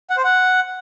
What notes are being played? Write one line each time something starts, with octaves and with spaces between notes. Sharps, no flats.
F#5
C5
F#5